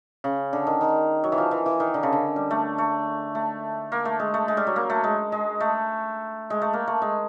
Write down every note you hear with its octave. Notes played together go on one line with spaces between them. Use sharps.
C#3
D3
D#3
D#3
F#3
E3
F3
E3
E3
D#3
D3
C#3
D3
G3
A3
A3
A3
A#3
A3
G#3
A3
G#3
G3
F#3
A#3
A3
G#3
G#3
A3
G#3
A3
A#3
A3
G#3